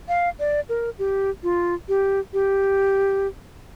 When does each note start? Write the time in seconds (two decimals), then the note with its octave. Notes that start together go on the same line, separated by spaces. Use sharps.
0.08 F5
0.39 D5
0.69 A#4
0.99 G4
1.43 F4
1.88 G4
2.33 G4